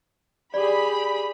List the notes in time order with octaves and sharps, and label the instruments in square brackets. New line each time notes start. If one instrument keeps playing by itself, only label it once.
[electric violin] G4 G#4 [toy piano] D5 D6 [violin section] B5